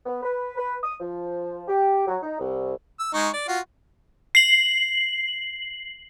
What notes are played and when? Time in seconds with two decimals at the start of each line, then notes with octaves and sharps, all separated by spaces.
0.06 B3
0.23 B4
0.57 B4
0.83 D#6
1.00 F3
1.68 G4
2.07 F#3
2.22 D#4
2.40 C2
2.99 E6
3.14 G#3 D#4 C#6
3.33 D5
3.48 F4 F#4
4.35 C7 F#7